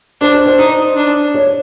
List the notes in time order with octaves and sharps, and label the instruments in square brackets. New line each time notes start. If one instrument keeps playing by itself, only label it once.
[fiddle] D4 [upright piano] C5
[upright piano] C5
C5
[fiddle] D#4
D4
[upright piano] C#5